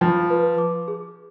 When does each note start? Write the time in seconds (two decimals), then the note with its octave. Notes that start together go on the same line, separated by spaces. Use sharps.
0.01 F3 F4
0.30 B4
0.58 D6
0.88 G#4